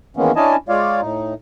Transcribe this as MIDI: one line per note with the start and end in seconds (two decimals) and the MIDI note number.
0.17 0.32 51
0.17 0.32 52
0.17 0.32 56
0.17 0.32 58
0.17 0.32 59
0.17 0.32 61
0.36 0.56 61
0.36 0.56 62
0.36 0.56 64
0.36 0.56 75
0.36 0.56 80
0.36 0.56 81
0.69 1.01 56
0.69 1.01 65
0.69 1.01 73
0.69 1.01 74
0.69 1.01 77
1.01 1.34 45
1.01 1.34 63